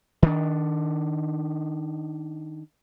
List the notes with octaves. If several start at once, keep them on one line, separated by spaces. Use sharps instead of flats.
D#3 D4